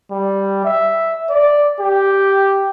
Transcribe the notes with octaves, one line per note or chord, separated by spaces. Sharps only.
G3
E5
D5
G4